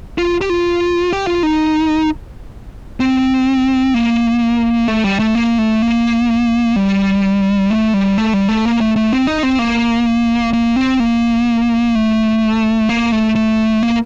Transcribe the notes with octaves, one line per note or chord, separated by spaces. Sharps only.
F4
G4
F4
G4
F4
D#4
C4
A#3
A3
G3
A3
A#3
A3
A#3
G3
A3
G3
A3
G3
A3
A#3
A3
A3
C4
D#4
C4
A#3
A#3
C4
A#3
A3
A#3
A3
A3
A#3